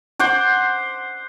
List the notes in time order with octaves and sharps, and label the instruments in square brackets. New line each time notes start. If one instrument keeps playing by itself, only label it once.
[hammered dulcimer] C5 F#5 D6